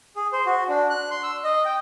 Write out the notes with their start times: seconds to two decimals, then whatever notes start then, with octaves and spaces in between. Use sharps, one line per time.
0.16 G#4
0.33 C5
0.46 F#4
0.69 D4
0.90 F#6
1.11 C6
1.23 E6
1.44 D#5
1.65 G5